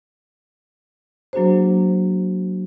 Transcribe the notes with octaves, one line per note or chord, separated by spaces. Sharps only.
F#3 A#3 D4 F#4 G#4 C5